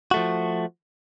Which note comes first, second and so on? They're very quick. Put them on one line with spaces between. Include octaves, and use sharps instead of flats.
F#4 A3 F3